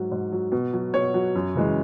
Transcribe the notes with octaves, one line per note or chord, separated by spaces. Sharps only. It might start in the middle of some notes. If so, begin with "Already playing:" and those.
Already playing: G#2 F#3
G#2
F#3
B2
F#3
B2 C#5
F#3
F#2
C#3 E3 G#3